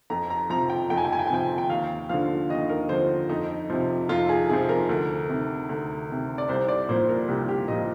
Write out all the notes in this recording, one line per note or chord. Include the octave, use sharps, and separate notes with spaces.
F2 A#5
A#5
C3 F3 A#5
G5
F2 G5
G#5
G5
G#5
G5
G#5
C3 F3 G5
G5
D#2 F5
D3 F3 F5
D#2 D#5
A#4
D3 F3 C5
F2 D#4
C3 F3
F2 F4
G#4
C3 F3 G#4
A#4
D2
C3 D#3
D2
C3 D#3
D5
C2 C5
D5
A#2 F3 C5
A#4
C2 G4
G4
A#2 F3 D#5